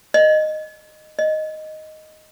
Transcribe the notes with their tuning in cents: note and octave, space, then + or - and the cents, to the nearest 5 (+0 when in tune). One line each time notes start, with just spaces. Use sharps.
D#5 -10
D#5 +0